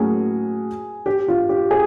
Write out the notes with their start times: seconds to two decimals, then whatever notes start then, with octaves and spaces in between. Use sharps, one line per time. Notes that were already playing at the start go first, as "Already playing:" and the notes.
Already playing: A2 F#3 A#3 C#4 F#4 G#4
1.06 G4
1.28 F4
1.49 G4
1.71 G#4